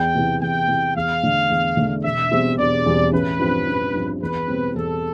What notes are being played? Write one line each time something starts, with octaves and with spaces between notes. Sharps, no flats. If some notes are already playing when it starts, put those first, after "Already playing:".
Already playing: E2 G5
C3 E3
E2 G5
C3 E3
E2 F5
D3 A3 D4
E2
D3 A3 D4
E1 E5
E2 B2 G3 C4
E1 D5
E2 B2 G3 C4
A1 B4
G2 F3 C4
A1
G2 F3 C4
E2 B4
B2 G3 C4
E2 A4